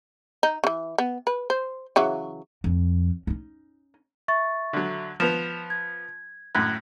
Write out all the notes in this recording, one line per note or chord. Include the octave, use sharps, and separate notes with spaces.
D#4
C#3 E3
B3
B4
C5
C#3 E3 F#3
F2
C#4 D#4
E5 C#6 A6
D3 F#3
F3 B3 E7 F7
G#6
F#2 A2 F#6 G#6